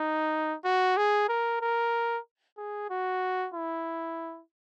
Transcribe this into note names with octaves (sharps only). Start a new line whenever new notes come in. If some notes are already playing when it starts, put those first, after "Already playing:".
Already playing: D#4
F#4
G#4
A#4
A#4
G#4
F#4
E4